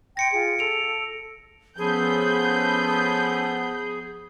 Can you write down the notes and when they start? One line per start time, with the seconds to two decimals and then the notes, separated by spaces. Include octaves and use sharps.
0.17 G5 C6 G#6 A#6 C#7 D7
0.32 F4 G#4
0.59 A4 D7 F7
1.78 F3 B3 C#4 G#4 A4 B4 B5 G6